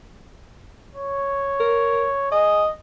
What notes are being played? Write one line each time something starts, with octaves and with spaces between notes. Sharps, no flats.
C#5
A#4
G#4 D#5